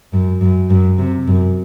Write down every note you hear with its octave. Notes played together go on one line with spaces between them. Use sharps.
F#2
F#2
F#2
C3
F#2